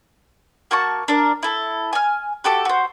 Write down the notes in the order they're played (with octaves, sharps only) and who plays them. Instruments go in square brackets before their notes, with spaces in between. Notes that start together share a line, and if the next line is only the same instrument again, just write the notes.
[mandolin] A#3 F#4 A5 C#6
D4 A#4
E4 A4
G#5 F6
F#4 G4 A4 D6
F#4 C5